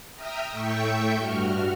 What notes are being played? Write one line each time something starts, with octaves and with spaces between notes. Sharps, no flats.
E5 G5 A#5 D#6 F6
A2 A3 E5 G5 C#6 G6
G2 F#4 F6